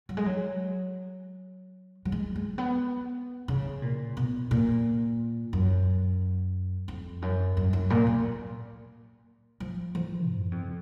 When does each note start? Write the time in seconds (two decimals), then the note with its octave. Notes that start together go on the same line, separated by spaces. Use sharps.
0.09 F#3
0.17 G#3
0.26 F#3
2.05 F#3
2.12 G#3
2.36 G#3
2.58 B3
3.48 C#3
3.82 A#2
4.17 B2
4.51 A#2
5.53 F#2
6.88 F2
7.22 F#2
7.57 F#2
7.73 F#2
7.90 A#2
8.07 A#2
9.60 F3
9.95 F3
10.28 F#2
10.52 F2